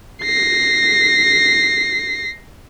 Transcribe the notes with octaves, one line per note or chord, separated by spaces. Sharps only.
A#6 C7